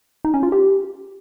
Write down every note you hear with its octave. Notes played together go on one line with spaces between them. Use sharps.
D#4
C#4
F4
G4